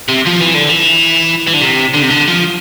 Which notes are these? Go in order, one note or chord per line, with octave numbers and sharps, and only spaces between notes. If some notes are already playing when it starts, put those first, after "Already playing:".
C3
F3
E3
D3
E3
E3
D3
C3
D3
C3
D3
F3